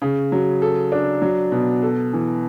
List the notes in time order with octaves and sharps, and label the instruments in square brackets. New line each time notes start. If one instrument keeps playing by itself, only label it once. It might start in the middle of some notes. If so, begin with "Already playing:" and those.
[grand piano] C#3
F#3
A4
D4
F#3
B2
A4
E3